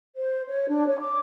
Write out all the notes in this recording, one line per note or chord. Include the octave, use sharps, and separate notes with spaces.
C5
C#5
D4
C#5
D6